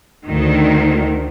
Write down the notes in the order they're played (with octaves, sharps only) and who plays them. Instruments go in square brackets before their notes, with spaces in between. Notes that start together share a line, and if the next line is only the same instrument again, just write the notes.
[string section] D2 D#3